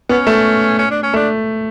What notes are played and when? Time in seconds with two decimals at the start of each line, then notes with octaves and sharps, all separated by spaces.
0.09 B3 C#4
0.27 A3
0.78 C#4
0.91 D4
1.03 C#4
1.14 A3 D4